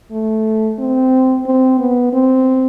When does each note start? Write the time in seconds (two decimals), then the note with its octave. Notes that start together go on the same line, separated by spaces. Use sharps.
0.11 A3
0.79 C4
1.46 C4
1.79 B3
2.13 C4